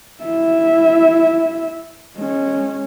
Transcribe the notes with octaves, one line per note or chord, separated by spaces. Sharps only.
E4 E5
G#3 C#4